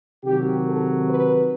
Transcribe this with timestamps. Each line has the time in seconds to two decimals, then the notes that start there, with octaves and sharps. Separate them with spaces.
0.24 C3 D#3 F#3 G4
0.65 A4
1.07 B4